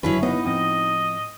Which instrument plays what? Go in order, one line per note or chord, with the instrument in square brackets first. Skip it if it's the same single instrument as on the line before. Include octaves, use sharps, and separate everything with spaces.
[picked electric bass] G1 C#3 D4 [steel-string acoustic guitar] F#3 E4 B4 [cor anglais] C#4
[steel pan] B3 [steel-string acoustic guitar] D#4 [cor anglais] D#5
[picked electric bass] A2 F3 C4 [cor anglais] D#5